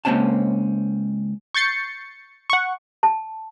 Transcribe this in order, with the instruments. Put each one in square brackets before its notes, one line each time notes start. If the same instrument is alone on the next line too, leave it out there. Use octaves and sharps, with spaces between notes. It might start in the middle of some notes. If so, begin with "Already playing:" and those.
[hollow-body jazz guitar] C#2 F3 A#3 C4 C#4 A5
[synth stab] C#6 G6 A6 C7 C#7
F#5 C#6
[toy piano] A5